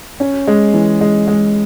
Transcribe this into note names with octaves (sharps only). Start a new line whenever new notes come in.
C#4
G#3
E3
G#3
G#3